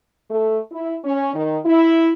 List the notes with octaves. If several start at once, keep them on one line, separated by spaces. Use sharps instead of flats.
A3
E4
C#4
D#3
E4